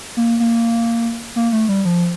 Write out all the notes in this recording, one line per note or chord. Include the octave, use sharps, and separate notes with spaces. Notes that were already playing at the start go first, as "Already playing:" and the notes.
A#3
A#3
A#3
A3
G3
F3